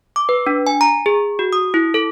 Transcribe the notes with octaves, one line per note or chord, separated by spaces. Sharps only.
D6
B4
D4
G#5
A#5
G#4
F#4
D#6
E4
A4